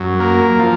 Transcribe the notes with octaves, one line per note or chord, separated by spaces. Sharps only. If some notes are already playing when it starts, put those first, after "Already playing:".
Already playing: F#2
A#3
F3